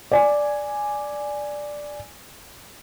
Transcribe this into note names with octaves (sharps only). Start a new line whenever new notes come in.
D5 G#5